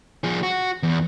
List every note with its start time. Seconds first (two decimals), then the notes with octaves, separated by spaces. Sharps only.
0.24 F3 G#4
0.43 F#4
0.83 E2